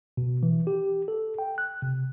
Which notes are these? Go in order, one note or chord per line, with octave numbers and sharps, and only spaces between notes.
B2
E3
G4
A4
G5
F#6
C3